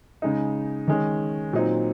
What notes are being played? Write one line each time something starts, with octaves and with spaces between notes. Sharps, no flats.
C#3 G#3 D#4
D#3 G#3 C#4
A#2 F#3 C4 D#4